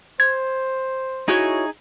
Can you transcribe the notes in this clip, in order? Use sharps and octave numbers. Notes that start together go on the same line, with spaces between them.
C5 G#6
D#4 E4 F#4 G#4 C#5